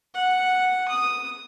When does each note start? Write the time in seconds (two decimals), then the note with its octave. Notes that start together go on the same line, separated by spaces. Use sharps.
0.14 F#5
0.88 D#6